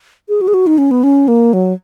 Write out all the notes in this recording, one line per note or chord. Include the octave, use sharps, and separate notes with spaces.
G#4
F#4
G#4
F#4
D#4
C#4
B3
C#4
A#3
F#3